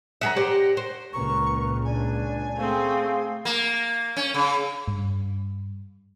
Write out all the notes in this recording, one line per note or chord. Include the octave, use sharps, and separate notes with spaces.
F#2 G#4 E5 F#5 A#5
G4 C5 D5
C5
C#2 A#2 C#3 A#4 B4 A#5 C#6
D4 D5 G#5
A3 C4 G#4 C5 F5
A#3
C#4
C#3
G2